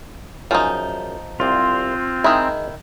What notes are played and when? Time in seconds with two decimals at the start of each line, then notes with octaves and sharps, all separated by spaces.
0.51 F#2 F3 D#4 G#4
1.40 C2 C4 F4 D5
2.24 D#3 G#3 D#4 E4 D#5